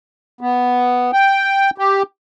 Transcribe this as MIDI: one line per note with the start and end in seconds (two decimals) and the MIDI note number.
0.41 1.11 59
1.13 1.70 79
1.78 2.03 67